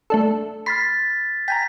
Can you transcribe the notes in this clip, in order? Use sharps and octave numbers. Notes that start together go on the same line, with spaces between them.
A3 D4 A4
B5 C6 F6 A6 B6 C7
G5 G#5 A#5 B6